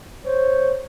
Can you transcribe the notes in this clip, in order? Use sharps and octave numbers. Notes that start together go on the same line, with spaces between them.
C5 C#5